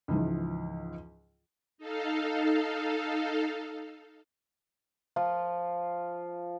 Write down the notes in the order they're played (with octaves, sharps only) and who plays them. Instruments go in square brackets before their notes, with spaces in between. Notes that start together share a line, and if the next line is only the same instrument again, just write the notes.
[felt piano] C#2 G#2 E3 F3
[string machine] D#4 A4 F5
[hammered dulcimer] F3 F4